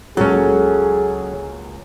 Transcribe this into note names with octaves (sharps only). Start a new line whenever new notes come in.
C#2 C#3 F#3 A#3 C#4 G#4 A4